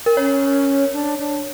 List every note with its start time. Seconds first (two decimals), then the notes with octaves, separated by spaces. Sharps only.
0.06 A#4
0.17 C#4 C#5
0.93 D4
1.18 D4